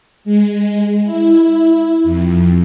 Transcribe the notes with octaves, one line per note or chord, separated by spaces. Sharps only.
G#3
E4
F2